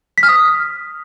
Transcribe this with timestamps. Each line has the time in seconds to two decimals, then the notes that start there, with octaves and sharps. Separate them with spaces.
0.18 B6
0.23 F6
0.28 D#6